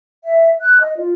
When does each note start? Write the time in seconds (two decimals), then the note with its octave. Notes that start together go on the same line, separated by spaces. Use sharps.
0.24 E5
0.60 F#6
0.80 D#5
0.95 F4